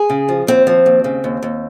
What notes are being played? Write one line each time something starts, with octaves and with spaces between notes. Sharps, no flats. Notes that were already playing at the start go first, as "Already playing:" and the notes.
Already playing: G#4
C#3
F3
D#2 C4
F3
D#2
C#3
D#2
D#2